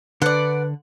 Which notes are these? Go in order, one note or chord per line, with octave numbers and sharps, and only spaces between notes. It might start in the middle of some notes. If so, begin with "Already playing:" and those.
D3 B4 D5 F#5